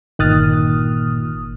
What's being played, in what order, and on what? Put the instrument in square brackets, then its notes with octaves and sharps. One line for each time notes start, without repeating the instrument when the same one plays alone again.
[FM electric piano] G1 D#6 F6 [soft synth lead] A#2 [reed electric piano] D#3 F#6 A6